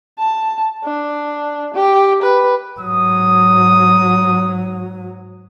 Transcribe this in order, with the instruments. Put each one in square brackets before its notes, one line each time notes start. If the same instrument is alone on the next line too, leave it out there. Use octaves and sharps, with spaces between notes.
[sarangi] A5
D4
G4
B4
[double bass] G#2 F#3 [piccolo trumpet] D#6